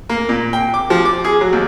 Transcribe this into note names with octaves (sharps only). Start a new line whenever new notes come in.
A#3
A#2
G5
D6
F3
D6
G#4
F#3
D#2